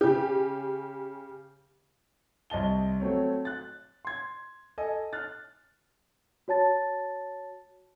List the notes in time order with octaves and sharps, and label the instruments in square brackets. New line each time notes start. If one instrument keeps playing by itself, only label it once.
[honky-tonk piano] C#3 G4
[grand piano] C2 D#5 A5 G7
F#3 A3 C4 C#5
F#6 A6
C6 G#6
A4 D#5 G#5
F6 F#6 A6
[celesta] F#4 C#5 A5 A6